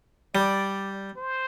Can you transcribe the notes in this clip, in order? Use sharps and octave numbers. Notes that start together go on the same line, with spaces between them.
G3 D5
C5